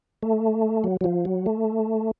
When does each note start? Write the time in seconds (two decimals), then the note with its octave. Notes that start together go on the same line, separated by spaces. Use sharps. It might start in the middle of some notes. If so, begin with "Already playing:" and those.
0.23 A3
0.84 F#3
1.01 F#3
1.04 F3
1.25 F#3
1.46 A3